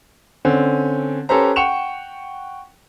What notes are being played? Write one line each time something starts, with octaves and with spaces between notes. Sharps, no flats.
D3 C4 C#4
C#4 G4 A4 B4 C5 A#5
F#5 G5 C#6 C#7 E7 F7